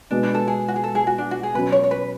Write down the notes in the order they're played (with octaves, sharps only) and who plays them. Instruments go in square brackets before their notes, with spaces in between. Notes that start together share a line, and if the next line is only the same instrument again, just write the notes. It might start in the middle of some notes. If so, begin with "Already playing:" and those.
[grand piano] B2 G#3 B3 [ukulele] D4
[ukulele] D4
A4
G#4
F#4
G#4
A4
G#4
F#4
D4
F#4
G#4
[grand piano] B2 F#3 C#4 [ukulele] B4
[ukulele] C#5
C#5
B4